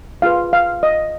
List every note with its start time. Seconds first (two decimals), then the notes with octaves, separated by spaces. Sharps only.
0.22 F4 G#4 B4 F5
0.53 F5
0.83 D#5